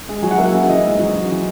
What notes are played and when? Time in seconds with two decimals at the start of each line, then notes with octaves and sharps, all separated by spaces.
0.09 G#3
0.23 F#3 G#5
0.31 F#5
0.38 A#3 E5
0.44 F#5
0.53 C#3 E5
0.68 E3 D#5
0.84 G#2
0.99 F#3
1.14 C#3
1.30 E3